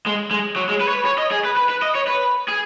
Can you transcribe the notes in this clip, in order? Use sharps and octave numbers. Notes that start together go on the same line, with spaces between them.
G#3
G#3
F#3
G#3
B4
C#5
B4
C#5
D#5
G#4
B4
B4
B4
D#5
C#5
B4
G#4